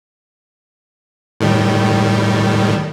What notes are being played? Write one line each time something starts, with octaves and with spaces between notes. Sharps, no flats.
A2 D#3 G3